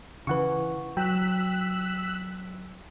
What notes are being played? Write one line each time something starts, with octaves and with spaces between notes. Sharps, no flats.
C#3 E3 B4 F#5 C#6
F#3 G5 E6 F#6 B6